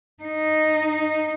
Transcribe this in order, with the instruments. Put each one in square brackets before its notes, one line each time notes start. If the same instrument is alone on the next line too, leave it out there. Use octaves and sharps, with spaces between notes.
[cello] D#4